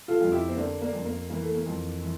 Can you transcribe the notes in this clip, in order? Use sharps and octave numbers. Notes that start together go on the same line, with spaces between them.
F4 A4
F2 F4
E4 G4
C4
D3 A#3 D4
A#3 D4
F2
A#3
E3 A#3
A3
A#3
F2
E3